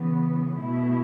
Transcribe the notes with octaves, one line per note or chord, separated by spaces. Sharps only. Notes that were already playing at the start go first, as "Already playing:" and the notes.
Already playing: C#3 E3 B3
B2 A3 E4